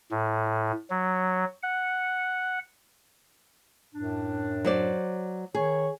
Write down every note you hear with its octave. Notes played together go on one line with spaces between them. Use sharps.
A2
F#3
F#5
F#2 A2 D4
F#3 C5 D5
D#3 G#4 C#5